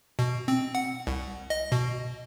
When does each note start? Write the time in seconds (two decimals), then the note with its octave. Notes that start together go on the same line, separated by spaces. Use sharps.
0.19 B2
0.48 C4
0.75 F#5
1.07 C2
1.50 D#5
1.72 B2